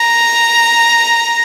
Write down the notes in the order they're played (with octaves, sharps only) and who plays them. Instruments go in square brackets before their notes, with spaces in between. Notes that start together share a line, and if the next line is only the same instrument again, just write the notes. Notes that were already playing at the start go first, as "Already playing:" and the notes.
Already playing: [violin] A#5